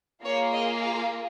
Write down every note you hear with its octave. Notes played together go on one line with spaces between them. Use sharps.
A#3 F4 G#4 C#5
D#5
F5